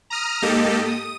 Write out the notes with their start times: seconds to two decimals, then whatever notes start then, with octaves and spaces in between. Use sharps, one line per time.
0.10 A#5 D#6 F6
0.42 G#2 A#3 G4 A4 D#5
0.86 D#6